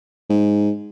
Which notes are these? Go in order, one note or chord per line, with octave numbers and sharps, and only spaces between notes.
G#2